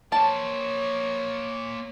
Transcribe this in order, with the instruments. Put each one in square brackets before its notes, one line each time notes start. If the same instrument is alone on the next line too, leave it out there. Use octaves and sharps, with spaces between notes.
[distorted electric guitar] A#3 C5 [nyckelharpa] C#5 [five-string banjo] A5